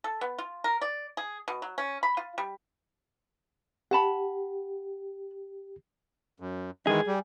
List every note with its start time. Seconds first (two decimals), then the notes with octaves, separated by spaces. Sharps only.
0.04 A4
0.21 B3
0.38 F4
0.64 A#4
0.82 D5
1.17 G#4
1.48 B2
1.62 F#3
1.78 C#4
2.03 B5
2.17 F4
2.38 G3
3.91 G4 F#5 A5 B5
6.40 F#2
6.87 D#3 E3 G#3 G#4
7.07 G3